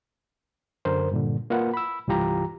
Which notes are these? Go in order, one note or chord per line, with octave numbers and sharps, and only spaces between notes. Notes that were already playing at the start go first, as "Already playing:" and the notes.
F#2 D3 A#4 C5
G2 A#2 D3
A#3 F4 A#4 B4 F#5
B5 E6
C2 G2 E3 F4 G4 A#5